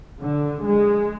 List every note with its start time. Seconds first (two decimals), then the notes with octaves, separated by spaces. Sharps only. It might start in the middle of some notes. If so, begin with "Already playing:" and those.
0.22 D3
0.66 G#3